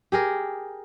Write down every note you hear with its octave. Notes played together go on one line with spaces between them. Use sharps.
G4 G#4 A#4